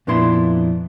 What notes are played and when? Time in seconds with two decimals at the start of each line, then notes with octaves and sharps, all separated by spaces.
0.07 F2 A#2 B3 D4 E4 C6